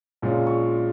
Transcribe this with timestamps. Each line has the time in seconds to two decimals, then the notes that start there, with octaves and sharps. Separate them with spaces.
0.22 A#1 A#2 G#3 C#4 F4
0.47 C#6